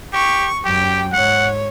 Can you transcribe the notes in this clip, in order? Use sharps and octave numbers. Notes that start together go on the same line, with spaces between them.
G4 C#6
F#2 G4 G5
G#2 C#5 F#5